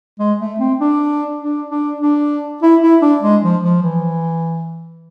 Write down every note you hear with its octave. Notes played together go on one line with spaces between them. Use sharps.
G#3
A3
C4
D4
D4
D4
D4
E4
E4
D4
G#3
F3
F3
E3